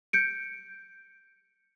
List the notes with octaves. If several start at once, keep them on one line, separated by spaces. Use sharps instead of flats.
G6 C#7 D7